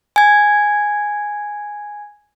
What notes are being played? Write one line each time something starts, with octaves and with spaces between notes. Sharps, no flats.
G#5 G#6